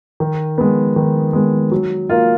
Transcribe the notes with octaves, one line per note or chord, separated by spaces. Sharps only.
D#3
G#3 B3
D#3
G#3 B3
F#3
A#3 F4